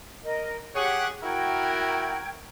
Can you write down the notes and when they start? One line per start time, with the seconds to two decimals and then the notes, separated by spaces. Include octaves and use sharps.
0.24 A#4 D#5
0.75 G4 G#4 C#5 F#5 F#6
1.23 E4 F#4 A#4 G5 G#6